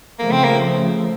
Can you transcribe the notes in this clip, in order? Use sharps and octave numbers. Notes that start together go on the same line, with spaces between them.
C#3 F3 A3 A#3
C4
A#3